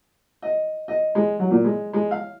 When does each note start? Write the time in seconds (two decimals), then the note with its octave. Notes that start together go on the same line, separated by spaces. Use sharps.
0.42 D#5
0.88 D#5
1.15 G#3
1.39 F#3
1.51 A#2
1.64 G#3
1.93 G#3
2.11 F5